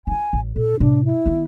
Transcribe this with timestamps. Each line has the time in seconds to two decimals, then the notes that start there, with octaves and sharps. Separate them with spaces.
0.07 E4 F4 G#5
0.33 A1
0.56 A#2 A4
0.80 A2 C3 D4
1.05 E4
1.26 D#3 B3